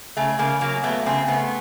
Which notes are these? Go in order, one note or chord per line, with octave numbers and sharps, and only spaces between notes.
C#3 A3
C#3 A#3
F#3 A#3
A3 B3
C#3 C4
A3 B3